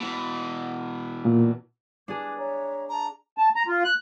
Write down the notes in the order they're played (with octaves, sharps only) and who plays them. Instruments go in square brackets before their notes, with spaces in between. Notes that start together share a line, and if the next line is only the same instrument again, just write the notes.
[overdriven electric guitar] B2 E3
[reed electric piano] A#2
[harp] D4 G#4 [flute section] B4 D6 G#6
[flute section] C#5 E5 A#5
[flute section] A5 [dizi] A#5
[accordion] A5
A#5
F4
F#6